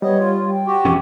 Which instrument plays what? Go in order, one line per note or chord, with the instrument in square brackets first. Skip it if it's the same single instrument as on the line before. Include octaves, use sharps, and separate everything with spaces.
[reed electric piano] G3 [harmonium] B3 D#5 [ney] C#5
[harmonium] F4
[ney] G5
[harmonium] F#4 G4
[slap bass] E1 C#4 [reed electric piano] F2